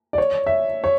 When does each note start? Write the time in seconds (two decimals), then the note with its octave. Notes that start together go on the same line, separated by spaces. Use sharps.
0.13 D5
0.18 C#5
0.46 E5
0.84 C#5